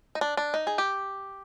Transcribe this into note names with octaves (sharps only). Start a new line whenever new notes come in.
D#4
D4
D4
D#4
G#4
G4